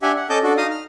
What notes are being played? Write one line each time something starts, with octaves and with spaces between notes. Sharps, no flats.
D4 G4 E5 F#5 G#5
F#5
C#4 A4 D#5 A5 D6 G6
D4 F#4 A4
D#4 D#5 F5 D#6
F6